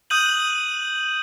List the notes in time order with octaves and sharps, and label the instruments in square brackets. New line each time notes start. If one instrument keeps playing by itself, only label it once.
[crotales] D#6 F#6 G6 D#7 F#7